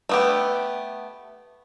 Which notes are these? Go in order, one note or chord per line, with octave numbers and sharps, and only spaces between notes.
A3 B3 G4